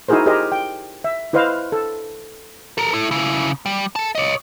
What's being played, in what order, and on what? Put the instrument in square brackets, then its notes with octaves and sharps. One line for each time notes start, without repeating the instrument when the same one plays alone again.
[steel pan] D#4 E4 F#4 G#4 A#4 C5
G4 G#4 A#4 C5 D#5
G5
E5
E4 B4 C5 D#5 F5
A4
[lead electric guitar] A4 A#4
E4 A4
C#3 E4
G3
A4 A5
C#5 D#5